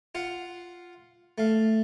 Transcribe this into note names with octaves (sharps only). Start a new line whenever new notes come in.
F4 F5 F#5
A3 F5